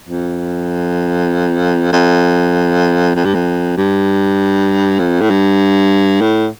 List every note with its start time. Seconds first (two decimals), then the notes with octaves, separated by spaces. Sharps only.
0.09 F2
1.93 F2
3.15 F2
3.25 G2
3.34 F2
3.77 G2
4.99 F2
5.21 A2
5.30 G2
6.21 A2